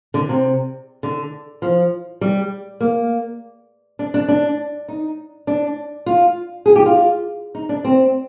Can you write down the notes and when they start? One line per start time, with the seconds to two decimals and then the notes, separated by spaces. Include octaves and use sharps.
0.14 D3
0.29 C3
1.03 D3
1.62 F3
2.21 G3
2.81 A#3
3.99 D4
4.14 D4
4.28 D4
4.88 D#4
5.47 D4
6.06 F4
6.66 G#4
6.76 G4
6.86 F4
7.55 D#4
7.69 D4
7.85 C4